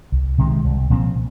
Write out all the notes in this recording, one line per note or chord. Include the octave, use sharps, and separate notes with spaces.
C2
C3 D#3 G#3
C2
A#2 F3 C4